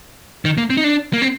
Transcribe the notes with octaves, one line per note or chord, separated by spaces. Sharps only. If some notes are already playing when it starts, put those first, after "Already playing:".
D#3
A#3
C4
D#4
D4
A#3
C4